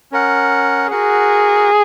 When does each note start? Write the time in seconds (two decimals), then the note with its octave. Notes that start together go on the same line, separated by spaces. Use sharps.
0.12 C#4 A#4 F#5
0.91 F#4 G#4 A#4 F#5